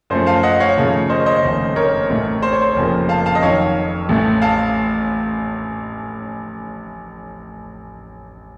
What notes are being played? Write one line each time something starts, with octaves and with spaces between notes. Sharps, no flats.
F#2 F3 A3 C5
F5 A5
D#5 F#5
C#5 F5
D#2 C#3 F3 A3
C5 D#5
C5 D#5
F1 D#2 C#3 A3
A#4 C#5
A1 A2 A3
C5
C#5
C5
F1 F2 C#3 F3 A#3
F5 A5
F5 A5
D#5
F2 D#3 F#3 C#5 F5
A1 A2 A3
F5 A5